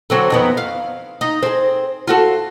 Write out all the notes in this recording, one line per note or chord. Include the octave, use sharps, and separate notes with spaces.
D3 F#3 C4
F2 D#3 B3
F5
D#4
C4 G#4
F4 F#4 A4